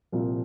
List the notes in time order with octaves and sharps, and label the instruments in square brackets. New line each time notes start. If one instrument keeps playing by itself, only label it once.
[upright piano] C2 A#2 F3 C4